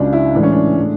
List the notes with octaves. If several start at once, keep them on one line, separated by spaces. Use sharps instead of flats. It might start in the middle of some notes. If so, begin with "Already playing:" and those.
Already playing: C#2 C#3 F#3 D4
E4
A2 E3 G#3 D4
C#4
D4
A2 G#3